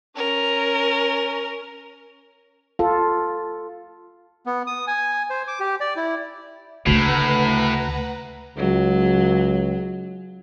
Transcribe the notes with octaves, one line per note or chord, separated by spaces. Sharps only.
C#4 A#4
F4 A4
B3
D#6
G#5
C5
D6
G4
D5
E4
D2 A2 C#3 A3 B4 F#5 A#5
C#2 F#3